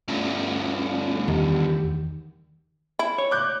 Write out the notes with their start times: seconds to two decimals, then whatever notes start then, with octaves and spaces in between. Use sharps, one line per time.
0.08 D2 G2 A3 C#4 F4
1.28 E2 D#3 G4
2.99 E4
3.18 C#5
3.31 D6 F#6 G6